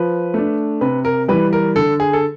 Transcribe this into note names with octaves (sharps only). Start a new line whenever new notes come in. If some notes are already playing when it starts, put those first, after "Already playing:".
Already playing: F3 B4
A3 D4
C3 B4
A#4
E3 G3 B4
A#4
D3 A4
G#4
A4